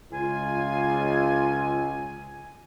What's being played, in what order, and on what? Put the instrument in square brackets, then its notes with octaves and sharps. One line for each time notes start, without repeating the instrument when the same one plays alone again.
[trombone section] C#2 [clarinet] F4 [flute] G#5